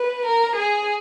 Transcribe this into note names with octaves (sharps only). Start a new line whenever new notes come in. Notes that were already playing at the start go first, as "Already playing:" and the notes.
Already playing: B4
A#4
G#4